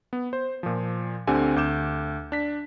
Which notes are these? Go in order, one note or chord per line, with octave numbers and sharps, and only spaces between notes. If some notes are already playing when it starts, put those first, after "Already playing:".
B3
C5
A#2 F3
D2 D3 C4 G4 G#5
D2 D6 G6 E7
D4 B6